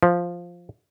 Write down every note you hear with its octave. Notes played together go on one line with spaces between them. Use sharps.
F3